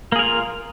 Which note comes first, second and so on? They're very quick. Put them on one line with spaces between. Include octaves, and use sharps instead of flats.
A#3 G#4 A#4 F4